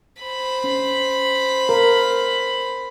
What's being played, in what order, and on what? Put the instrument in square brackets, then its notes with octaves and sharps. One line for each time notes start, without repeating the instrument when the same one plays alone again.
[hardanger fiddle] C5 B5
[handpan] C#4
A#4